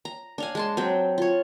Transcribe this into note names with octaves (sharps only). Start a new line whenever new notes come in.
A#5
D4 F5 G#5
G#3 A5 C6
F#3 C4 G5
F4 C#5